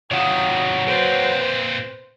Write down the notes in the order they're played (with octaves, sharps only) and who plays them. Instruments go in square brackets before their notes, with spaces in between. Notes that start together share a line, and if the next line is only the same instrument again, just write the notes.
[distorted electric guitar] C3 D#3 [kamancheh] F4 D#6 [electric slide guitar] C#5 F#5 G5
[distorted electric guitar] A#2 C4 [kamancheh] B4 C5